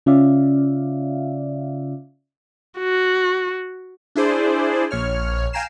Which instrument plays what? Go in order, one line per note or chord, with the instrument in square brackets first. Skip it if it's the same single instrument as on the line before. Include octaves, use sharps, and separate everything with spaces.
[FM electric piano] C#3 C#4 F4 D5 E5 F5
[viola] F#4
[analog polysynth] D4 E4 G#4 C5 D5
A#1 C#5 F6
F5 G5 G#5 A#5 C7 E7